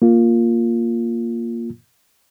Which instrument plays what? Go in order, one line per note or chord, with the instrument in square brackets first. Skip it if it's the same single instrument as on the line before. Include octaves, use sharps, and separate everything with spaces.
[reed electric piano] A#3 F4